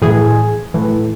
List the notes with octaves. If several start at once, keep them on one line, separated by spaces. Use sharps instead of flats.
A2 E3 G#4
A2 E3